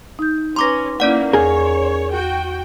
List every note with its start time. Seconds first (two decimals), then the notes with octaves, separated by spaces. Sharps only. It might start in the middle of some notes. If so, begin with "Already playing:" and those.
0.19 D#4 G6
0.56 C#4 B4 A#5 C6 D6 A#6
1.00 A#3 C#4 E4 D5 F#5
1.33 E2 G#4 A#4 C#5
2.12 F#4 G5